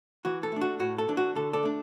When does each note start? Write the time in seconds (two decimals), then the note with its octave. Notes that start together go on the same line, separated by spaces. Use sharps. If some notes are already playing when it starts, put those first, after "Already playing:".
0.25 E3 F#4
0.43 A4
0.52 A3 D4
0.61 F#4
0.80 A2 F#4
0.98 A4
1.08 E3 D4
1.17 F#4
1.35 D3 A4
1.53 A4 D5
1.63 A3 D4